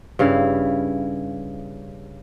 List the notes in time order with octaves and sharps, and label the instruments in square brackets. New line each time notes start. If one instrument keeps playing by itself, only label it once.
[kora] G2 C#3 E4 F5